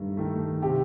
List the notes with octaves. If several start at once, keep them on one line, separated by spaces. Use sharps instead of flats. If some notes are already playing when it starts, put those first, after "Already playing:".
Already playing: G2 D#3 A3
D#3 A3
C3 G4